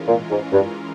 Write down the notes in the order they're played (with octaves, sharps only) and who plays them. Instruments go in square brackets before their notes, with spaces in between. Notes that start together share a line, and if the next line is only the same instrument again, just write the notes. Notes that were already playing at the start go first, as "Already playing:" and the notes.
Already playing: [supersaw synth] E3 G#3 C#4 F4 A#4
[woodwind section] A#2
G#2
G2